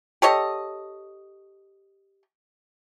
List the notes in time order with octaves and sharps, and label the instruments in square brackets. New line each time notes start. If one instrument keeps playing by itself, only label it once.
[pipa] G4 A4 C#5 D#5